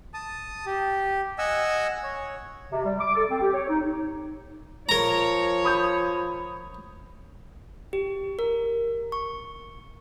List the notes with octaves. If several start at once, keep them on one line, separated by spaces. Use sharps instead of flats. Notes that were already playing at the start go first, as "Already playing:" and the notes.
A5 D#6
G4
D#5 F#5 G#5 E6
C#5
C3
G3
D6
A4
C4
G4
C#5
D#4
F3 A#4 C#5 A#5
B5 D#6 G6
G4
A#4
C#6